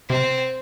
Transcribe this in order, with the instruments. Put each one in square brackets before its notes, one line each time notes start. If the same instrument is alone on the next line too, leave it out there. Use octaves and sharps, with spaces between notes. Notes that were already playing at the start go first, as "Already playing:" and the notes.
[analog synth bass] C3 [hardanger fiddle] C4